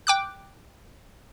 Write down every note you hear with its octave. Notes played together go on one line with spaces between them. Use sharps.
G5 D6 F#6